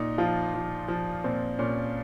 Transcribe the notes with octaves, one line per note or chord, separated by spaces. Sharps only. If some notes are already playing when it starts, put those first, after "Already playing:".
Already playing: A#2 D#4
F3 F4
F3
F3
A#2 C4
A#2 C#4